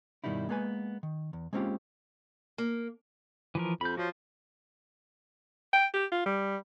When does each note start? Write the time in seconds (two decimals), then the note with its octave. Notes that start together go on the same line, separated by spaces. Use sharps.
0.24 G2 B2 D#3 G3 D#4 E4
0.49 G#3 A#3 B3 B4 G#5
1.03 D#3
1.33 E2
1.53 G#3 A#3 C4 C#4 F4 G4
2.58 A#3
3.55 E3 F3 A#4
3.81 F2 B5 G6
3.97 F3 F#4 C#5
5.73 G5
5.94 G4
6.12 F4
6.26 G3